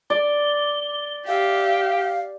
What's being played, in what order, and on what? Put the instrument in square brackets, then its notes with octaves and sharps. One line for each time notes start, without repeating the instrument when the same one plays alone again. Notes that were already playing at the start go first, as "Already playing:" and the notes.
[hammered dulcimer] D5 [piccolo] G7
[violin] G4 [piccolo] E5 [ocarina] F5